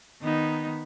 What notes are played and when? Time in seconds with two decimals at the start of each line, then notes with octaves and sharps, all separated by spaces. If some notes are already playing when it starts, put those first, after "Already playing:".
0.22 D#3 B3 D#4